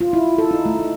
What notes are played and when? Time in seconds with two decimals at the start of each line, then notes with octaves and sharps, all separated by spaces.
0.01 F4
0.13 E4
0.38 A4
0.51 D#4
0.66 A3
0.79 D#4